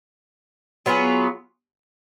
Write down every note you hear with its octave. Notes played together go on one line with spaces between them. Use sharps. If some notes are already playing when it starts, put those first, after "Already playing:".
F#3 B3 F4 G#4